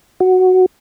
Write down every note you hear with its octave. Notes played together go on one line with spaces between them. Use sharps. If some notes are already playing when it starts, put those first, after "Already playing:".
F#4